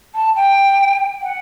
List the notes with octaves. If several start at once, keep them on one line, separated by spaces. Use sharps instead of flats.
A5
G5
F#5